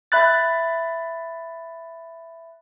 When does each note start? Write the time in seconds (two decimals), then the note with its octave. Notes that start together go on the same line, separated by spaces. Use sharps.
0.12 E5 B5 F#6 A6